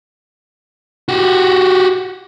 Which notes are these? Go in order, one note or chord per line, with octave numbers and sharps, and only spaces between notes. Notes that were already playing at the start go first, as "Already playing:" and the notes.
F#4 G4